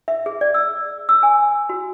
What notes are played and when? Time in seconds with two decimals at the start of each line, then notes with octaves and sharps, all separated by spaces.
0.08 E5
0.26 G#4
0.41 D5
0.54 E6
1.09 E6
1.23 G#5
1.70 F#4